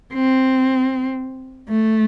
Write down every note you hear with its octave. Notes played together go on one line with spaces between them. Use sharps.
C4
A3